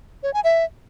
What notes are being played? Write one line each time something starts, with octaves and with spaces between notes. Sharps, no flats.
C#5
G#5
E5